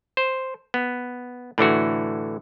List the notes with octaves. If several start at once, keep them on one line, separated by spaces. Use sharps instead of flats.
C5
B3
A2 D3 E3 F#4